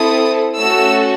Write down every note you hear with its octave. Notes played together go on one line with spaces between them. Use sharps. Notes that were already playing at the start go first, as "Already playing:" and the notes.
Already playing: C4 E4 A4 D#6
A3 C#4 F#4 A4 E6